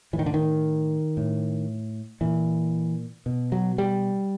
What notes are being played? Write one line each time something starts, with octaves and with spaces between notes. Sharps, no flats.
A2 E3
D#3
D3
D#3
A2
A#2 E3
B2
F#3
G3